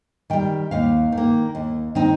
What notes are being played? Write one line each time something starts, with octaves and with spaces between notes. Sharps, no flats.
D#3 G3 G5
D#2 F5
D#3
A#3
D#2
D#3 C4 D#4